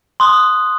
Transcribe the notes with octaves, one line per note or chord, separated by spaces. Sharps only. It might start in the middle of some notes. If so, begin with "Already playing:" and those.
C6 D#6 F#6